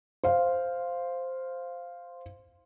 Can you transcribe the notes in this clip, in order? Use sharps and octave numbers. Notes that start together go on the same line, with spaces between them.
C5 F5